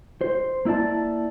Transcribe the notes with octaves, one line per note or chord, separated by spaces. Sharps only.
C5
A#3 E4 B4 D5 A5